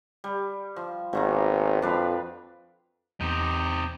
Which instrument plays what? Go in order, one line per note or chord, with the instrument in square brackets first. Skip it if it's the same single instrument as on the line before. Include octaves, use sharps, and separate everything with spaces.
[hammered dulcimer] G3
F3
[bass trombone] G#1 [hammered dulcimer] B2 D#3 A#3
[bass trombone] F2 [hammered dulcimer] D4 B4 F5
[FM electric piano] E2 G6 [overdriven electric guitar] C3 D#4